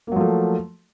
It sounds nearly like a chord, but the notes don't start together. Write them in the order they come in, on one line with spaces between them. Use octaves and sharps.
A#3 F#3 F3 A3